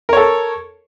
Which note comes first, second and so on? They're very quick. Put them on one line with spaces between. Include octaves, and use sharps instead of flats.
A#4 C#5 A4